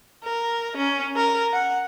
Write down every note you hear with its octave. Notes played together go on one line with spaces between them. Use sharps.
A#4
C#4
A#4
F#5